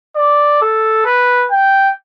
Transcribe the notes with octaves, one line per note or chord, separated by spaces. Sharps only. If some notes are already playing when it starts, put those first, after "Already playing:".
D5
A4
B4
G5